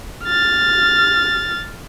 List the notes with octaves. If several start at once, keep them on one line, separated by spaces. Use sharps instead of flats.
F6 A6